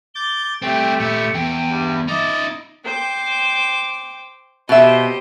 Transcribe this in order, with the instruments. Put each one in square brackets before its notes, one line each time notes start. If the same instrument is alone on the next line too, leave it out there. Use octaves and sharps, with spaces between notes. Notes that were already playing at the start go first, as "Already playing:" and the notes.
[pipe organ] D6 G6 A6 [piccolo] G7
[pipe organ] A3 G4 [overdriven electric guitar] C4 E4 [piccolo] G5
[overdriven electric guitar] A#2 E4 [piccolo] C#7
[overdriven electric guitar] E2 [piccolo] G5
[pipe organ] G2
[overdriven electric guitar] D#4 E5 [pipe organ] D#5 D6 [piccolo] A6
[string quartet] C5 G5 D6
[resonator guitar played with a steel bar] B2 E5 [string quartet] G4 C5 D#5